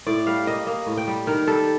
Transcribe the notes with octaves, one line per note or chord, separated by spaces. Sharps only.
A2 D5
G3 F5
A#3 D#5
A#3 D#5
A2
G5
G3
D#3 A#4
G3 A4